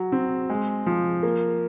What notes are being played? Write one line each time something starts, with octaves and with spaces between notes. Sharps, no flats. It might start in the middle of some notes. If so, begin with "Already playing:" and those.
Already playing: F#3
C4
G#3
F3
A#3